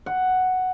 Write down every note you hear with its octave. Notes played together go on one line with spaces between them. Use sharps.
F#5